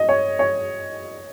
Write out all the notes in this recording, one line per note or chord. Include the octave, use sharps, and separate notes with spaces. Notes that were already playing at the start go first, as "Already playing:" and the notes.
Already playing: D#5
C#5
C#5